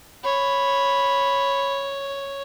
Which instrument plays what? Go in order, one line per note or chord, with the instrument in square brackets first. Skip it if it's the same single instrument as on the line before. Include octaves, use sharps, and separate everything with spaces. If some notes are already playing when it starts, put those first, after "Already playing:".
[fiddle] C#5 [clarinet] B5